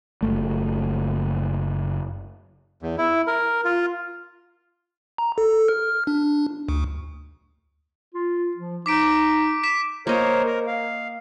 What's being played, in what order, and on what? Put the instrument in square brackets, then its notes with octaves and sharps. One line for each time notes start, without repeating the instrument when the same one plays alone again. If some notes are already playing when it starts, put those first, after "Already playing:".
[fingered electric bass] F#1 A3
[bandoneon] E2
E4
A#4
F4
[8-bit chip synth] A#5
A4
F6
D4
D2
[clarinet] F4
F3
[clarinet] D#4 [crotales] D6 B6 D7
[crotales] B6 E7
[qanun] A#3 D#5 [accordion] A#4 C5 C#5
[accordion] A#4
F5